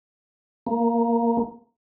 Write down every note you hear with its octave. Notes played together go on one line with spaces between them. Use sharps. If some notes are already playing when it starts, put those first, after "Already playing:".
A#3